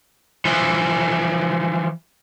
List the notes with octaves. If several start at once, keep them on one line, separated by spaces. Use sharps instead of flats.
E3 F3